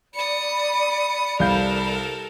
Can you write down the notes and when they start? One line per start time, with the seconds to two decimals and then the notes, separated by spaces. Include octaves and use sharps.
0.14 D5 B5 D#6 C#7
1.40 C2 A4 A#4 F5 G6